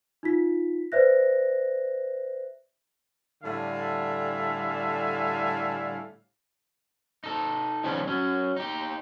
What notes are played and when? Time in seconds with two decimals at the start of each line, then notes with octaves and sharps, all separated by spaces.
0.23 D#4 F4 B6
0.92 B4 C5 D5 E5 F#6 A#6
3.44 A2 D3 G3 E5 F5 G#5
7.24 D#4 A4
7.84 D#3 F3 G3 B3 C#4 G#4
8.07 F#3 C#4
8.56 D#4 G4